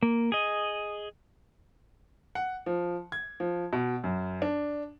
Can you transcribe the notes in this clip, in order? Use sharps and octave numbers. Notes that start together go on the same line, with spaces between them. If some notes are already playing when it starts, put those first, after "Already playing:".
A#3
G#4 D#5
F#5
F3
G#6
F3
B2
F#2
D4